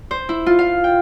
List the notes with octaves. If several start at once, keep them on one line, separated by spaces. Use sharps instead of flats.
C5
E4
F4
F5
G5